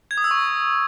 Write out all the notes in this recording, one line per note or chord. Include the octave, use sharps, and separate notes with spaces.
G#6
D#6
E6
C#6